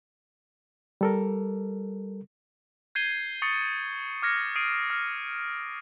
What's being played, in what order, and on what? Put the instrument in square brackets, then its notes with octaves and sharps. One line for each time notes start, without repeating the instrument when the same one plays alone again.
[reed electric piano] G3 A4 A#4
[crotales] G6 G#6 C7 D#7 G7
C#6 D#6 A6 C#7
D6 F6 G#6 A#6 C#7
D#6 C7 D7 D#7
F6